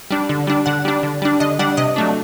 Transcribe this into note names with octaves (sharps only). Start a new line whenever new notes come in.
G3 D4
D3
G3 D4
D3 F#5
G3 D4
D3
G3 D4
D3 D#5
G3 D4 F#5
C3 D#5
F#3 A3 D4